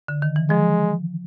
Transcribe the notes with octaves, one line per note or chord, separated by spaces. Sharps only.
D3
D#3
E3
F3 G#3